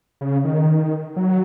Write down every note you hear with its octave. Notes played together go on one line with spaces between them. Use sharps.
C#3
D#3
F#3